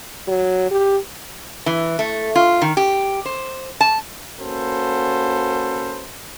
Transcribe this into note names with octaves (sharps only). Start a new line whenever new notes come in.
F#3
G4
E3
A3
F4
D#3
G4
C5
A5
A#3 C#4 F#4 A4 B4 C5